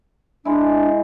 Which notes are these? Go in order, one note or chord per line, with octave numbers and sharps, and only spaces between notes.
G#3 D4 E4